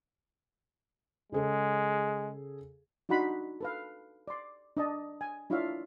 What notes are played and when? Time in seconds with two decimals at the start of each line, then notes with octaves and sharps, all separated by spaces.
1.32 C#3 G#3 G#4 A4
3.09 D4 D#4 F#4 F#5 B5 C6
3.61 A4 B4 F5
4.28 D5 C6
4.77 D4 D#5 A5
5.21 G#5
5.50 D4 E4 F4 C#5 E5 F5